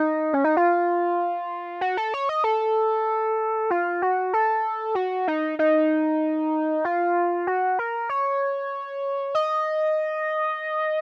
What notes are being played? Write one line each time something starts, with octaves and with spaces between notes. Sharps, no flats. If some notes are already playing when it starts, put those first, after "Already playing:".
Already playing: D#4
C#4
D#4
F4
F#4
A4
C#5
D#5
A4
F4
F#4
A4
F#4
D#4
D#4
F4
F#4
A#4
C#5
D#5